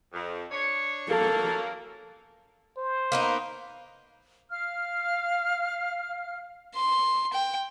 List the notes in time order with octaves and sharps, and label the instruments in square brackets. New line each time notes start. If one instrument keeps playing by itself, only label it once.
[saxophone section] F2
D4 C#5
[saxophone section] F#2 F#3 A#3 [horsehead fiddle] A4
[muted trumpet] C5
[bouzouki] A#3 B3 D#4
[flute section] F5 F6
[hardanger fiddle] C6
G5